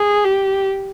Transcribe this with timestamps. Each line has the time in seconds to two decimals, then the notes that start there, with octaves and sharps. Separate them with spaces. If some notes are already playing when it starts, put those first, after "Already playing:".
Already playing: G#4
0.25 G4